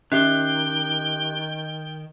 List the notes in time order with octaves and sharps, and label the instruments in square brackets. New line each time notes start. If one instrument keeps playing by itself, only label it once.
[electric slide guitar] D#3 [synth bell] C#4 E5 C7 [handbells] G4 F#6 [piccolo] G5